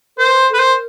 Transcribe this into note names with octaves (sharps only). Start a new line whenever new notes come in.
A#4 C5
B4
A4 B4
A#4 C5